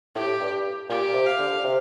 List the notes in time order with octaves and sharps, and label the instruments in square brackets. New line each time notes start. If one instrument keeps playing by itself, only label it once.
[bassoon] A2 [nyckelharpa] G4
[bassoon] G2
[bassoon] A#2 [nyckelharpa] G4
[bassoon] C3
[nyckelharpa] F5
[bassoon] D3
C3